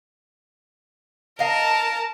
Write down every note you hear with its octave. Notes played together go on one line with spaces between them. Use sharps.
A#4 D#5 F5 A5